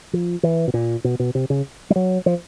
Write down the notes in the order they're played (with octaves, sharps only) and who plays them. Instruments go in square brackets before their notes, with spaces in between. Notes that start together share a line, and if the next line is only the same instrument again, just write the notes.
[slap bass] F3
E3
B2
A#2
B2
B2
C3
C#3
G3
F#3
F3